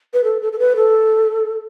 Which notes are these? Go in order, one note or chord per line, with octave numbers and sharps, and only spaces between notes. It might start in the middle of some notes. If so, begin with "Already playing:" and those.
B4
A4
A4
A4
B4
A4